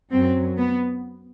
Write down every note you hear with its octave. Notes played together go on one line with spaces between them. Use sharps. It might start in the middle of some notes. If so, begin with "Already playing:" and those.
F#2 F#3 C4
B3